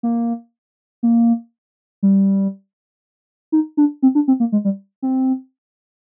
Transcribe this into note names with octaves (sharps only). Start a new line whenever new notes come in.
A#3
A#3
G3
D#4
D4
C4
D4
C4
A#3
G#3
G3
C4